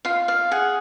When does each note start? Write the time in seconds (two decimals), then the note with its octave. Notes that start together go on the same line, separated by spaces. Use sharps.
0.05 F4 F5
0.28 D5 F5
0.51 G#4 F#5